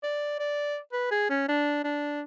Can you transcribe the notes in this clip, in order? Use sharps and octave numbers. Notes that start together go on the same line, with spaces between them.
D5
D5
B4
G#4
C#4
D4
D4